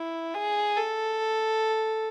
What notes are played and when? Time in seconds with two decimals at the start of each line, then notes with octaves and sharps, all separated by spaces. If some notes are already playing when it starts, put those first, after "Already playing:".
Already playing: E4
0.34 G#4
0.76 A4